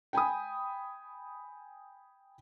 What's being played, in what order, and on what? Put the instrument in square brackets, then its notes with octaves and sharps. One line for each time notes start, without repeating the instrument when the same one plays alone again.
[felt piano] G5 G#5 B5 D#6